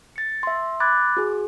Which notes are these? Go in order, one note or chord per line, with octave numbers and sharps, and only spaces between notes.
A6 C#7
E5 C6
B5 D6 F#6 G#6 A6
F#4 G#4